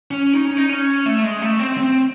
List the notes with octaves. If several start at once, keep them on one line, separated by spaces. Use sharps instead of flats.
C#4
D#4
C#4
D#4
C#4
A3
G#3
A3
C4
C4